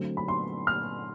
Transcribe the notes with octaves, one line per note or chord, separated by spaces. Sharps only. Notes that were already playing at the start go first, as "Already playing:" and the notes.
Already playing: D3 F#3 A3 C4
B5
C6
F6